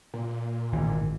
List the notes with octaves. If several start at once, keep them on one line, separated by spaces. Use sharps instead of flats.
A#2
G#1 E3